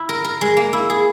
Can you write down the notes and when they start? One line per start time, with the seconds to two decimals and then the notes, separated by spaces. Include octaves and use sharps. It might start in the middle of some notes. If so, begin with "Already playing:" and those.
Already playing: E4
0.09 A#4
0.24 A#4
0.41 G#3
0.57 A#3
0.73 E4
0.90 G#4